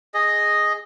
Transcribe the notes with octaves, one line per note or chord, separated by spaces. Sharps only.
G#4 D#5